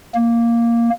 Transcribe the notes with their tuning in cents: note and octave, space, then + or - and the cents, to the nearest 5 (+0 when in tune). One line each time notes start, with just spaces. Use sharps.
A#3 +0